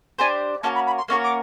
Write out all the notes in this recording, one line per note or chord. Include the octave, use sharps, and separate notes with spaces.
D4 G4 C5 G#5
A#3 C#4 F#4 A#4 A5
B5
B5
C6
A#3 C#4 F#4 A#4 C#6
D6